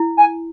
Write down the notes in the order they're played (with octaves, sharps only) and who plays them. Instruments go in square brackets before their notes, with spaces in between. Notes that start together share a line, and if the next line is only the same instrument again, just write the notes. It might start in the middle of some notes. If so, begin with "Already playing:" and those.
Already playing: [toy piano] E4
[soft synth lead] G#5